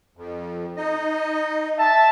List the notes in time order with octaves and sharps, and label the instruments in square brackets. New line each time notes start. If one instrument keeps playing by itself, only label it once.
[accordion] F2
D#4 D#5
[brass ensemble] E5 A5